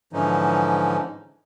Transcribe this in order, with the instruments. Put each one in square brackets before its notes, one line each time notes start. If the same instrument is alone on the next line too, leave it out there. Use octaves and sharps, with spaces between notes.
[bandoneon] G#2 D3 E3 F3 C#4 D#4